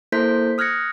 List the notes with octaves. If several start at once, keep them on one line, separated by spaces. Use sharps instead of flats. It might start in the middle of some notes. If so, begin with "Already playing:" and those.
A#3 E4 A4 C5 G6 B6
D#6 F6 F#6 G#6 A#6 C#7